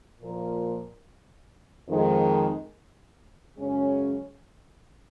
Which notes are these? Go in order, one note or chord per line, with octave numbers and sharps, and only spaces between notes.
A#2 F3 A#3 F4 A#4
F2 D#3 G#3
F#2 C#3 G#3 C#4